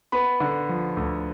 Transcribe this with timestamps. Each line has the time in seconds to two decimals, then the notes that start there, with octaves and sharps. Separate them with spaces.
0.12 B3 B5
0.40 D3
0.69 F3
0.97 D2